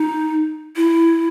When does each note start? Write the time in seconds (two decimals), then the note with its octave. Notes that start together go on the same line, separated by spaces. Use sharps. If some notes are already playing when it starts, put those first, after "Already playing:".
Already playing: D#4
0.76 E4